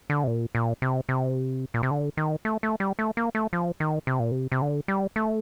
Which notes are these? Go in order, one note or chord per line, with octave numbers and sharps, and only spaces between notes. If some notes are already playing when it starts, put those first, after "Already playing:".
D3
C3
A#2
A#2
C3
C3
A#2
C3
D3
D#3
A3
A3
G3
A3
A#3
A3
F3
D#3
C3
A#2
C3
C3
D3
G3
A3